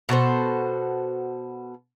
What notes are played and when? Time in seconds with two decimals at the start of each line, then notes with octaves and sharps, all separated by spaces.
0.09 B2 F#4 A4 C5